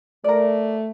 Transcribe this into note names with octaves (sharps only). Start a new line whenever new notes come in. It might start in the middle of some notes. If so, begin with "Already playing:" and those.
A3 A#4 D5